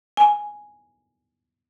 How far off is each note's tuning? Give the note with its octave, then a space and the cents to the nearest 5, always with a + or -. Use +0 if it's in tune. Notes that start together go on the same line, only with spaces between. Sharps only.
G#5 +0